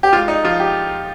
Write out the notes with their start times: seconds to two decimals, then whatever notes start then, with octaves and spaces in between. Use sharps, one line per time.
0.03 G4
0.13 G#2 F4
0.28 D#4
0.43 F3 F4
0.60 G4